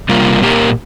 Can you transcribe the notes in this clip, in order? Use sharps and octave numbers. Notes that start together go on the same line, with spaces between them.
C3 G3 A#3 F4 A#4
A#2 A#3 G4 A#4